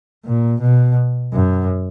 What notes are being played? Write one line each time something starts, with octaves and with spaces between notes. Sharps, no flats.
A#2
B2
F#2